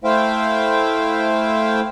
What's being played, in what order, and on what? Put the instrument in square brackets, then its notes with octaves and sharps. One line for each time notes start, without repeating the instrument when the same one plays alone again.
[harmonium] A3 E4 C5 E5 F5 G5